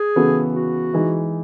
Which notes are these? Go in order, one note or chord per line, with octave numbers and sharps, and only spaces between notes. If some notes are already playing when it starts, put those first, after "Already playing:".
Already playing: G#4
C#3 E3 B3 F#4 A4
F#4
E3 G#3 D#4